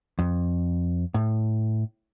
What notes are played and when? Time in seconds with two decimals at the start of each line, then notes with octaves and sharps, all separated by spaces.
0.19 F2
1.14 A2